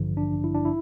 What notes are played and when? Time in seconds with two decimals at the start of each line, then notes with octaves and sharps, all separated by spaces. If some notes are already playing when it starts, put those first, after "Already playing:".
Already playing: A1 G2 D3 F3
0.17 D4
0.44 E4
0.54 D4
0.65 E4